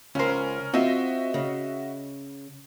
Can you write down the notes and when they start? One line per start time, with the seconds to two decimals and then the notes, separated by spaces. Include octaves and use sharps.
0.15 C#2 C#4 A#4 C5
0.74 C4 F4 F#4 D#5 E5
1.34 C#3